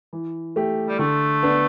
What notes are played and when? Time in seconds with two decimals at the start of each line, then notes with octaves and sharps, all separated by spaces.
0.13 E3
0.56 A3 G4
0.89 G3
0.99 D3 A3
1.43 B3 D4